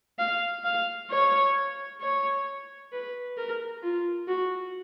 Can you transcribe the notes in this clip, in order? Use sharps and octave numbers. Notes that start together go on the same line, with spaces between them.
F5
F5
C#5
C#5
B4
A#4
F4
F#4